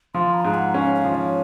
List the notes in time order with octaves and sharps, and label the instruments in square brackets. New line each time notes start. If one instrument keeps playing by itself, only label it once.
[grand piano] F3 [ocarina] C6
[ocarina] A#5
[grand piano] G#2
[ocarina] F#5
[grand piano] C#4 [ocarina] F5
[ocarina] F5
[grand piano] F3
[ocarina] C#5